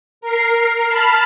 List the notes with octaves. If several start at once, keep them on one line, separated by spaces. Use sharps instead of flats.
A#4 C7
A5 B5 F6